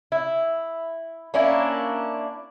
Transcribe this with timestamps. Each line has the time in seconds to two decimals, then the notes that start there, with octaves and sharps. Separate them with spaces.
0.12 E4
1.34 A#3 C#4 D4 E4